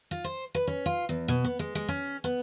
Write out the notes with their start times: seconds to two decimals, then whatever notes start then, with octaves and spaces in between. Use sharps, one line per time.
0.11 F4
0.24 C5
0.55 B4
0.67 C#4
0.86 F4
1.09 E2
1.28 B2
1.45 B3
1.59 G#3
1.75 G#3
1.88 C#4
2.24 B3